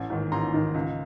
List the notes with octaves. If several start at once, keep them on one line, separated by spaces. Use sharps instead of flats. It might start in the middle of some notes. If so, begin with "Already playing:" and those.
Already playing: A1
G#2 D#3
A1 A#5 C6
G#2 D#3
C#2